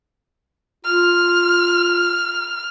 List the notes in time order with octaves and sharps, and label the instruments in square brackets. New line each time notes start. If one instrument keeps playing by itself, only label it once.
[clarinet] F4 [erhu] F6